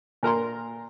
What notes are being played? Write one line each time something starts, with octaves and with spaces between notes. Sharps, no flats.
A#2 A#4 A#5 C6